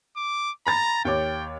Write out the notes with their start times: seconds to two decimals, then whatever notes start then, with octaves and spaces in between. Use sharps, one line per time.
0.17 D6
0.67 A#5 B5 A6
1.05 D#2 C#5 G5 D6